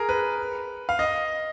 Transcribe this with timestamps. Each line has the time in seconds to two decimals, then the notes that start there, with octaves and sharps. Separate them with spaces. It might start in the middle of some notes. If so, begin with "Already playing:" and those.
Already playing: G#4 A#4
0.09 B4
0.89 F5
0.99 D#5